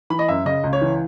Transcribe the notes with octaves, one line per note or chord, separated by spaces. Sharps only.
E3 B5
D#5
F#2 E5
C#3 D#5
C#2
C#5
E3